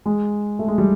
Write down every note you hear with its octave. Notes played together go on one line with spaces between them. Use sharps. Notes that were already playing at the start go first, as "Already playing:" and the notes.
G#3
A3
G#3
G3